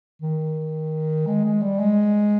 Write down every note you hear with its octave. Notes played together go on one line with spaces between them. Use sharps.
D#3
G#3
G#3
G3
G#3